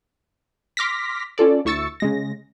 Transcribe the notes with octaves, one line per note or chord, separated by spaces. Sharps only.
C6 D6 F6 A#6 B6
C#4 F4 A4 D5
D2 E4 C#6 E6 A6 C#7
C#3 G#3 A#6